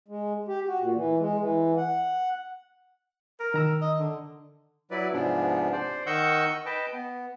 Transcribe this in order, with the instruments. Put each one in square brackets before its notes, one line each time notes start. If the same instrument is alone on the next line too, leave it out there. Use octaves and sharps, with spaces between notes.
[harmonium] G#3
G4
F#4
A#2
E3
G#3
E3
F#5
[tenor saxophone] A#4
[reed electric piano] D#3 A#5 E6
[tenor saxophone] D#5
D3
[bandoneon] F#3 E4 B4 D5
G#2 C3 F3 G#3 B3 D4
C5 D5
D#3 D#5 F#5 C#6 E6 G6
B4 D#5 G5 A5
B3